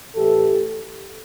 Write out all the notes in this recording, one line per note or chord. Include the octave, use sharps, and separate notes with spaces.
A2 E3 G4 A4